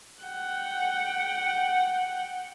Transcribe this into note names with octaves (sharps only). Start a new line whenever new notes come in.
F#5 G5